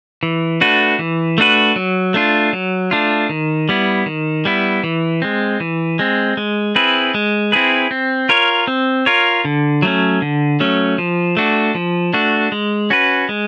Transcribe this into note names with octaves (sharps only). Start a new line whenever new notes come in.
E3
A3 D4 F#4 B4
E3
A3 D4 F#4 B4
F#3
A3 D4 F4
F#3
A3 D4 F4
D#3
G3 B3 E4
D#3
G3 B3 E4
E3
G#3 C4
E3
G#3 C4
G#3
C4 E4 G#4 B4
G#3
C4 E4 G#4 B4
C4
F4 A#4 C#5
C4
F4 A#4 C#5
D3
F#3 A3 C#4
D3
F#3 A3 C#4
F3
A3 D4 F#4
F3
A3 D4 F#4
G#3
C#4 F#4 B4
G#3